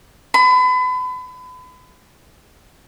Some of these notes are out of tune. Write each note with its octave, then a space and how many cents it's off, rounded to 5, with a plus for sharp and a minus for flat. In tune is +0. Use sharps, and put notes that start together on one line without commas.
B5 +35